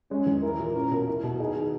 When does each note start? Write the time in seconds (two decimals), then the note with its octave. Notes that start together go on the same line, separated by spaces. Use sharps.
0.11 G#3 C#4
0.26 E2
0.42 E4 A#4
0.60 A#2
0.75 C#4 A#4
0.91 B2
1.08 E4
1.24 B2
1.39 D#4 G#4
1.56 D#3